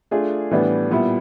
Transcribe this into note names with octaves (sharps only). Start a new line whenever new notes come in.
A3 D4 F4 G#4
A2 E3 G3 B3 D4
A#2 G3 B3 E4